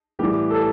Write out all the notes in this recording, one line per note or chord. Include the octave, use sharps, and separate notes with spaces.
A2 E3 G3 B3 G4
A4